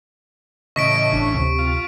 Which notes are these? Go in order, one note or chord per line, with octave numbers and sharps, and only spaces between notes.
A2 C#3 E3 C#4 D#5 C#6 B6 D7
G1 D4
D2 C3
F4